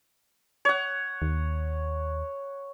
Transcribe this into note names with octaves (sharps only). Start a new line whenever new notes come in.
C#5 F#5
D#2